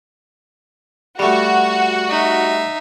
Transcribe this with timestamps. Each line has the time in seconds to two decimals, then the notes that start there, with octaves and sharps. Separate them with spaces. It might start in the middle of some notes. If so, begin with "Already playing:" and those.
1.19 G3 A3 F#4
2.09 D#4 E5